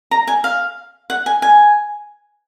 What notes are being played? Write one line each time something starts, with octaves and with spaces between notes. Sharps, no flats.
A#5
G#5
F5
F#5
G#5
G#5